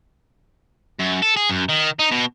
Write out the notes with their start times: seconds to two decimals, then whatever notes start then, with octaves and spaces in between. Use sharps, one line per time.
1.00 F#2
1.22 A4
1.37 G#4
1.50 F#2
1.69 D#3
1.99 D#4
2.12 B2